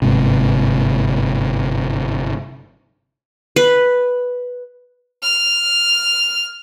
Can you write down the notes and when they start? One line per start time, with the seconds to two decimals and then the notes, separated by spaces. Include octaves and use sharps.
0.02 G1 G#2 C3
3.56 B4
5.22 F6